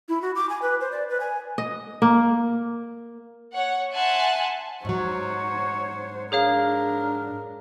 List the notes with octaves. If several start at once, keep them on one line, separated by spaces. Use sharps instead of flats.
E4
F#4
D6
G#5
B4
C5
D5
B4
G#5
D#5
A#3
C#5 F#5
E5 F#5 G#5 A5 C6 F#6
G#2 F#3 F#4 C5 C#5
D4 G#4 A#4 C#5 F5